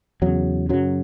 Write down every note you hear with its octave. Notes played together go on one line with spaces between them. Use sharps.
E2 C#3 F#3
F#2 C#3 F#3